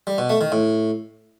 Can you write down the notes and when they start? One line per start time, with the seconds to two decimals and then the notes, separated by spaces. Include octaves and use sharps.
0.07 G3
0.18 B2
0.30 A3
0.41 D#3
0.52 A2